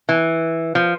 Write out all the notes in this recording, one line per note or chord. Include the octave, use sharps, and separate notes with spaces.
E3
F3